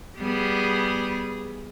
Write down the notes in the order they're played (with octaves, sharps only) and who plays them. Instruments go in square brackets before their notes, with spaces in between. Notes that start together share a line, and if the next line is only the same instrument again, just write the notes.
[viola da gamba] G3 B3 G#4